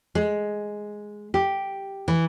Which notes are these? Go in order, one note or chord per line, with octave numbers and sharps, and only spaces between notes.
G#3
G4
E3